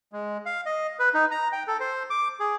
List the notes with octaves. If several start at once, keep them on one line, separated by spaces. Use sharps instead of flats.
G#3
F5
D#5
B4
D#4
A#5
G5
A4
C5
D6
G#4